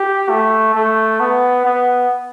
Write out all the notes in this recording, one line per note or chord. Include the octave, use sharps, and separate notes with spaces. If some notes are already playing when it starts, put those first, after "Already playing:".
Already playing: G4
A3
A3
B3
B3